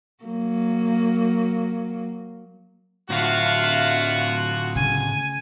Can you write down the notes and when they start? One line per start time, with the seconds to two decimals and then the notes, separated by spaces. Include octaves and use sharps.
0.24 F#3 A#3
3.10 A2 D3 F4 F#4 E5 F5
4.76 C#3 G#5